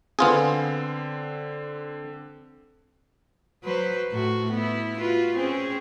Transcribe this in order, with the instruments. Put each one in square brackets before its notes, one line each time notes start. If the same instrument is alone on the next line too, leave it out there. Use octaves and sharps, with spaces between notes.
[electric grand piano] D3 C4 [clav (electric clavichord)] B3 F4 G#4
[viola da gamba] F#3 B4 C5
A2 F#4
B3 E4
F4 F#4 B4
C4 C#4 G#4